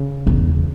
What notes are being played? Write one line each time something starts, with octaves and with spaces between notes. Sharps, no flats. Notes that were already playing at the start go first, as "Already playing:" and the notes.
Already playing: C#3
E2